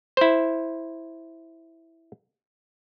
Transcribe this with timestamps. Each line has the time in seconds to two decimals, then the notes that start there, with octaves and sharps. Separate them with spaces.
0.17 E4 C5